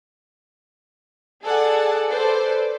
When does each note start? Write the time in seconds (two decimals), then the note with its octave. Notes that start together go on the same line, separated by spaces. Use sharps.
1.43 G#4 A4 D5 F#5
2.09 A4 B4 C5 D5